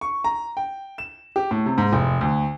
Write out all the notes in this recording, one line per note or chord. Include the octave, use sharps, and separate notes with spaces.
C#6
A#5
G5
E7
G4
A2
C3
G#2
F1
D2